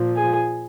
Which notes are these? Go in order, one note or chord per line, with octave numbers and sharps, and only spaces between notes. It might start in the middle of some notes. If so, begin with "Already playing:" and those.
Already playing: A#2 F3
G#4